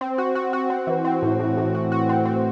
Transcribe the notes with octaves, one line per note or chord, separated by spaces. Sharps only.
C4
F#4
F#4
F#4
C4
E3
C4
A2
A2
A2
F#4
F#4
C4
C4